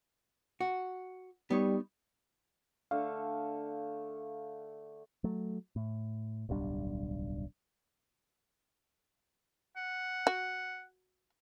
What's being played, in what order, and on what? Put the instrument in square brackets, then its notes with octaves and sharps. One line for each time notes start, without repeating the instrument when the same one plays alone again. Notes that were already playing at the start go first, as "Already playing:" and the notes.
[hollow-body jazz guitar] F#4
[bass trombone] G3 [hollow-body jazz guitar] B3 D#4 C#5
[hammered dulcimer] D3 A3 [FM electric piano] F5
[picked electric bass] F#3 A3
A2
D1 B1 G3 D4
[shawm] F#5
[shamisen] F#4